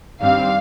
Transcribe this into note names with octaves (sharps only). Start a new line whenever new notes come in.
G2 D#3 G3 C4 F5